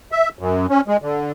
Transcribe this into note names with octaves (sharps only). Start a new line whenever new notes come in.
E5
F#2
C#4
G#3
D3